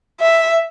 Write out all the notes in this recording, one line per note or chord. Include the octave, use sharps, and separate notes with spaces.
E5